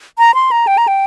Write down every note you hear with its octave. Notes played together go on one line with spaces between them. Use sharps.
A#5
C6
A#5
G5
A#5
G5